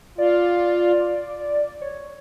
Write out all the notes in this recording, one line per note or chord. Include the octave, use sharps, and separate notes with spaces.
F4 D5
C#5